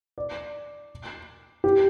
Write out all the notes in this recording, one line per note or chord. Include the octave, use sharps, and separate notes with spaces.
D5
G4